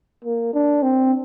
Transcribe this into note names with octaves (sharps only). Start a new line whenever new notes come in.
A#3
D4
C4